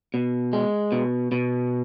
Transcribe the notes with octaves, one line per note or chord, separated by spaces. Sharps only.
B2
G#3
B2
B2